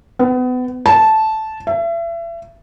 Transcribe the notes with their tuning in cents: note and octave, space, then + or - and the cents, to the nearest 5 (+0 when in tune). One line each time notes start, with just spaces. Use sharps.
B3 +30
A5 -10
E5 +35